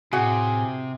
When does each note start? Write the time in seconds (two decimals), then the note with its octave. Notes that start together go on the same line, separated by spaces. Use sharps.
0.13 A2 C3 F#4 G#4 F#5